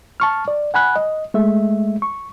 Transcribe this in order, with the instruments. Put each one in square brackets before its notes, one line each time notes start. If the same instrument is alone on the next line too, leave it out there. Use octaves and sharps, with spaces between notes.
[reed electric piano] A5 C#6 F6
D5
F#5 G#5 B5 F#6
D#5
G#3 A3 E5
C#6